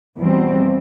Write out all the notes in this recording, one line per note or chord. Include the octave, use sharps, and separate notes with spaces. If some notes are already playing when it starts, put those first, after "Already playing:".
E2 B2 G3 C4